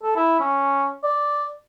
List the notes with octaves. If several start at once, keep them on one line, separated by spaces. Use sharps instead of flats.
A4
E4
C#4
D5